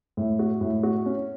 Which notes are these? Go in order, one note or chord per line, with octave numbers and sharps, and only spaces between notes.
A2
F#4
A2
F#4
C#4